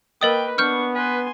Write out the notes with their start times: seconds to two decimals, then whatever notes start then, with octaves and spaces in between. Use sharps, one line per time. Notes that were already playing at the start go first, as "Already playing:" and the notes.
0.21 A#3 A#4 B4 D#5 G5 D#6
0.58 B3 D4 C#6 F6 G6
0.95 B4 G#5 C6